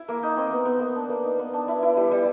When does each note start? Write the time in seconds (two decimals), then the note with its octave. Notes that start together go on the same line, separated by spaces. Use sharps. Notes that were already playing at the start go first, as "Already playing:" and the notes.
Already playing: E4
0.08 A#3
0.23 D#4
0.37 C4
0.51 B3
0.65 B3
0.80 A#3
0.95 D4
1.09 A#3
1.24 D#4
1.39 B3
1.54 D4
1.68 E4
1.82 E4
1.97 G3
2.11 G3